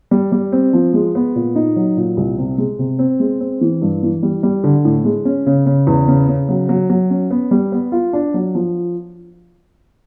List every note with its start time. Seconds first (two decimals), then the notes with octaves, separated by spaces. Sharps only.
0.11 G3
0.32 G3
0.52 C4
0.73 F3
0.94 G#3
1.15 B3
1.35 A#2
1.56 D#4
1.76 F#3
1.97 A#2
2.17 C2
2.38 C3
2.58 G#3
2.79 C3
2.99 C4
3.20 G#3
3.40 C4
3.61 E3
3.82 G2
4.03 E3
4.23 G3
4.43 G3
4.64 D3
4.85 A2
5.05 G#3
5.25 C#4
5.46 C#3
5.66 C#3
5.87 E2
6.08 C#3
6.28 C#3
6.49 F#3
6.69 F#3
6.90 F#3
7.10 C#4
7.31 B3
7.51 G3
7.72 B3
7.92 F4
8.13 D4
8.34 F#3
8.55 F3